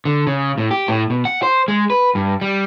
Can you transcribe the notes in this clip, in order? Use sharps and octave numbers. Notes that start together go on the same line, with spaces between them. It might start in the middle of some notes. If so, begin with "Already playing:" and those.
D3
C#3
A2
G4
A2
B2
F#5
C5
G#3
B4
G2
G3